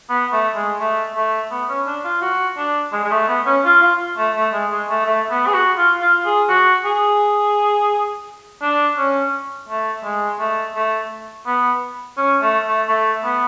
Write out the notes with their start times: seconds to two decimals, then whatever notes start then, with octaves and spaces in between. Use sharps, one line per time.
0.09 B3
0.32 A3
0.56 G#3
0.80 A3
1.15 A3
1.51 B3
1.69 C#4
1.87 D4
2.04 F4
2.21 F#4
2.57 D4
2.93 G#3
3.04 G#3
3.11 A3
3.28 B3
3.46 C#4
3.65 F4
3.82 F4
4.18 A3
4.36 A3
4.53 G#3
4.71 G#3
4.89 A3
5.06 A3
5.30 B3
5.47 G#4
5.54 F#4
5.77 F4
6.01 F4
6.26 G#4
6.49 F#4
6.85 G#4
8.62 D4
8.98 C#4
9.69 A3
10.04 G#3
10.39 A3
10.75 A3
11.46 B3
12.17 C#4
12.42 A3
12.66 A3
12.88 A3
13.24 B3